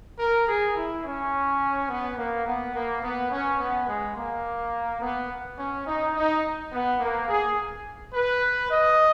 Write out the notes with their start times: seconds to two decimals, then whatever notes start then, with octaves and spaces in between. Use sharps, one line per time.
0.19 A#4
0.48 G#4
0.76 E4
1.04 C#4
1.90 B3
2.18 A#3
2.47 B3
2.75 A#3
3.03 B3
3.31 C#4
3.60 B3
3.88 G#3
4.17 A#3
5.02 B3
5.59 C#4
5.87 D#4
6.15 D#4
6.73 B3
7.00 A#3
7.29 G#4
8.14 B4
8.71 D#5